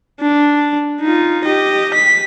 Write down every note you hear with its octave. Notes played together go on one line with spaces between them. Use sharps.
D4
D#4 F4
G4 D#5
B6